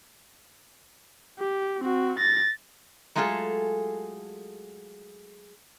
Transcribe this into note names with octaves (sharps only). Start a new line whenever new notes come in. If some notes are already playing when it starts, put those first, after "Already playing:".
G4
C4 F#4
A6 A#6
F#3 G#3 A3 F4 G#4 A4